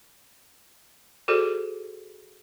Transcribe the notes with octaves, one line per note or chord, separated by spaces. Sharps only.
F#4 G#4 A4 C5 D5